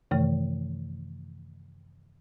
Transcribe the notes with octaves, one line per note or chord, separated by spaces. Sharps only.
F#2 C3 D#3 E3 A3